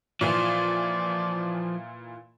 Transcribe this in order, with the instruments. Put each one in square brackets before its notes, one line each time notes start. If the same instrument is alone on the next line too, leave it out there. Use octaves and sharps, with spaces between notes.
[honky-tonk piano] A#2 E3 [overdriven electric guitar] F3 [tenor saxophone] D5